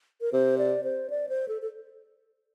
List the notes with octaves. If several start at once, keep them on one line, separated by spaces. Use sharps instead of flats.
A#4
C3 C5
D5
C5
D5
C5
A4
A4